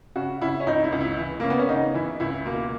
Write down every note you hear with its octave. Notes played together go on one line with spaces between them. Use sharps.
C#3 F#4
C#3 E4
C#4
C#2 D#4
E4
C#2
E4
E3
C#3 A#3
B3
C#4
C#3 D#4
E3 E4
C#2 E4
B2 A#3